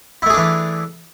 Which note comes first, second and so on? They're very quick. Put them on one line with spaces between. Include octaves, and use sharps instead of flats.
E4 A3 G#4 D4 E3